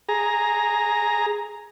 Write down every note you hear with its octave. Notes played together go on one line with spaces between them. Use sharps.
G#4 A#5